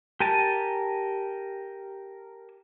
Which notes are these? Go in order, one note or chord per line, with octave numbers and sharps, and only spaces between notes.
G4 A#4 G#5 A5